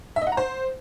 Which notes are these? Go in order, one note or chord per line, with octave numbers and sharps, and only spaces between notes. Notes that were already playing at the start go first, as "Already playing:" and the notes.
E5
D#5
F#5
A#5
C5